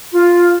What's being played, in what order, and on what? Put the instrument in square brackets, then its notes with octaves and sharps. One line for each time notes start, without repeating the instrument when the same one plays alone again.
[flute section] F4